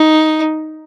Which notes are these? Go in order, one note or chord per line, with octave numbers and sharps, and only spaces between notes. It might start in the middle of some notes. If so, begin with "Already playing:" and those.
Already playing: D#4